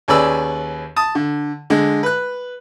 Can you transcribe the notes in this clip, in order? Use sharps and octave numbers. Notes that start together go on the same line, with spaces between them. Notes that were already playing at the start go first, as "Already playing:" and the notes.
D#2 C#4 G#4 B4 D5 E6
A5 D#6
D3
D3 G#3
B4 F#6